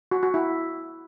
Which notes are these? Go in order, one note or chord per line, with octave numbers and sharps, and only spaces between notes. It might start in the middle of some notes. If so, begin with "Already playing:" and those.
F#4
F#4
E4